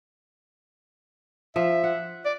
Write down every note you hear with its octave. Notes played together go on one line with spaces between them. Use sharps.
F3 E5
F#5
D5